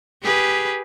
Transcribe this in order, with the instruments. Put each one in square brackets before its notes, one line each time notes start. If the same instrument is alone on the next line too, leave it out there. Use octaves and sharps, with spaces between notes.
[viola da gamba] G4 G#4 B4